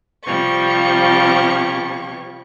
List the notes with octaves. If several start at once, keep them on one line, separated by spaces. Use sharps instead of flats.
C3 F3 G3 C#6